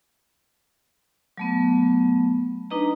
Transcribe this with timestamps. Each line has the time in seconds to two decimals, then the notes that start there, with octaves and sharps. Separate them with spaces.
1.37 F#3 A3 B3
2.71 D4 D#4 B4 D#5 A#5